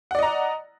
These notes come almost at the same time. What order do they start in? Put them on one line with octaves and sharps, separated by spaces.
F#5 D5 D#5 A#5